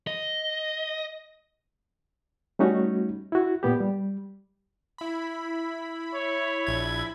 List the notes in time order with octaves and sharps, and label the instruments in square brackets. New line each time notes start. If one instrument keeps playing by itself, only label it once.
[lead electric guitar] D#5
[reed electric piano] G3 A3 C#4 D#4 F#4
E4 F#4
A#2 B3 G4
G3
[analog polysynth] E4 B5
[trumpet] C#5
[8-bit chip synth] A#1 G#6